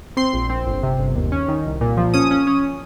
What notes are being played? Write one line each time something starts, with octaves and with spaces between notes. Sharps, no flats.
C4 C6
A#1
C4
G1
C3
G1
D#2
C#4
D#3
C2
A#2
F3
C#4 D#6
C#4
C#4